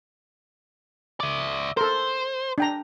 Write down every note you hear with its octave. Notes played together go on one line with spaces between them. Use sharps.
D5 E5
A4 A#4 C5
D4 G5 A#5